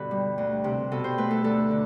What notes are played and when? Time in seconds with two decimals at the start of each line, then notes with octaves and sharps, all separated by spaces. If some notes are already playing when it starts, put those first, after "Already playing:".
Already playing: G2 B2 D3 A4 B4
0.11 G3
0.38 D2
0.64 C3
0.92 B2 A4
1.04 C5
1.18 A3 B4
1.31 A4
1.44 D2 A4
1.71 D3